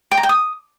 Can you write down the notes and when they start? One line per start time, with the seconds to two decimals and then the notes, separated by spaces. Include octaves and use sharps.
0.11 G5
0.17 A#5
0.23 G5
0.29 D#6